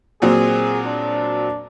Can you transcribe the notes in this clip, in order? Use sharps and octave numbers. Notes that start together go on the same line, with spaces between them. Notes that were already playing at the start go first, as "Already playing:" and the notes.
A#2 F#3 C4 G#4
D4